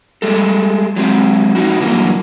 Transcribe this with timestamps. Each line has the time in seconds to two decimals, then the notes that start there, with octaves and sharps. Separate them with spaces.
0.22 G3 G#3 A4
0.96 F#3 G#3 C4
1.55 F2 G#2 D#4 F#4
1.80 G2 D3 E3 F#3 A#3